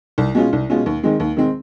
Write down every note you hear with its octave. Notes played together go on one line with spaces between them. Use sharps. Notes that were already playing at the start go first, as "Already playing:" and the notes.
C2
B2 G#3 C#4 F4
C2
B2 G#3 C#4 F4
D#2
D#3 G#3 C4
D#2
D#3 G#3 C4